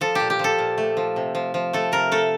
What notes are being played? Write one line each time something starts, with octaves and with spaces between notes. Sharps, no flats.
F3 A4
A#2 G4
G4
F3 A4
A#2
A3
F3
C3
F3
F3
A3 A4
C3 A#4
A3 A4